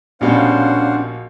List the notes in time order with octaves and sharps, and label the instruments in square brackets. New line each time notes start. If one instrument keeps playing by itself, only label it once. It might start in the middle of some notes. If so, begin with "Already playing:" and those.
[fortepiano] A#1 B2 G3 [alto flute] C#4 [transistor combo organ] D4 [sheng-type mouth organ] C5 F5 F#5